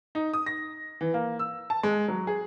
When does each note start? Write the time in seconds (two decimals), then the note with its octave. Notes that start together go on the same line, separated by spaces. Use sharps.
0.15 D#4
0.34 D#6
0.46 A#6
1.01 E3
1.14 A#3
1.39 E6
1.70 A5
1.83 G#3
2.08 F#3
2.27 G#4